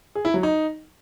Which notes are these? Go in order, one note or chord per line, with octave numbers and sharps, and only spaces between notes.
G#4
E4
F#3
D#4